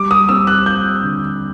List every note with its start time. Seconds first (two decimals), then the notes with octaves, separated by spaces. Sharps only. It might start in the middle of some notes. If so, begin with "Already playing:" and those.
Already playing: G3 D6
0.11 D#6
0.29 C4 E6
0.47 F#6
0.66 F4 G6
1.03 D3